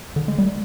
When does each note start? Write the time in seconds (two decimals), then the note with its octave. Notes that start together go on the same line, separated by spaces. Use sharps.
0.16 D3
0.28 G#3
0.38 G3